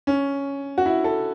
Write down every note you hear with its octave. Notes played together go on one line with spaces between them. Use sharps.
C#4
F#4
E4
A4